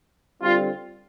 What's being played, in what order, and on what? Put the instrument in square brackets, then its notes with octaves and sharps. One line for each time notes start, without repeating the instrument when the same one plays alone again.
[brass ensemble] D3 G3 C4 F4